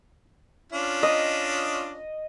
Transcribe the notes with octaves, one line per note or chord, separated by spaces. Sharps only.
C#4 D4 F4
D#5